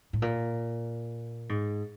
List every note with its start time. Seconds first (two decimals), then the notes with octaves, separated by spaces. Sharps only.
0.13 A2
0.22 A#2
1.49 G#2